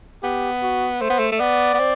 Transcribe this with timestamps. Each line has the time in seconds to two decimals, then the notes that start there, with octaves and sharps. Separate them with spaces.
0.23 B3 G4
0.62 F#4
1.01 A3 C5
1.10 B3
1.19 A3
1.32 A3
1.40 B3 D5
1.74 B3
1.79 C4